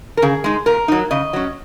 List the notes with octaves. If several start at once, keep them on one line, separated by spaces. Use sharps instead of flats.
A#4
C#3 G#4
G#3 D#4
A#2 A#4
F#3 D#4
C#3 D#5
F#3 C#4